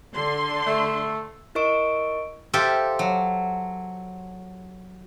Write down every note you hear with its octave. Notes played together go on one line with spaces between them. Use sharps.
D3 C6
A3
E4 A#4 D#5 C#6 D7
G4 A4 C5 E5 F5 G5
F#3